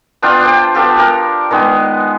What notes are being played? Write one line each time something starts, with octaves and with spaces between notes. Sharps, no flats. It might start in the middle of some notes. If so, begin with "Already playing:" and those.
B3 D4 F4 G5
C5 G5
B3 F4 G4 A4
G4 A#4
D#3 G#3 B3